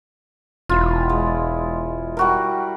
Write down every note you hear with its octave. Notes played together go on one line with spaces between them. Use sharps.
E1 E4 F4
G#3
G3 F#4 A#4